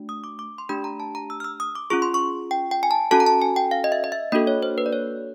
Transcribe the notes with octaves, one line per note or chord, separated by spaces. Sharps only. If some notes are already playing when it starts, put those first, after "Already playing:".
Already playing: A3 D4 F#4
D#6
D6
D6
C6
A3 D4 G4 B5
A#5
A5
A#5
E6
F6
E6
D#6
D6
C#4 F4 G#4 C#6
C6
C#6
G5
G5
G#5
A5
C#4 F#4 A4 A5
A#5
A5
G#5
G5
F5
D#5
E5
D#5
E5
A#3 D4 F#4 A4 D#5
C#5
C5
B4
D5
C#5